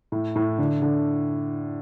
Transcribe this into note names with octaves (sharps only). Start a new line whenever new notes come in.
A2
A2
D3
D3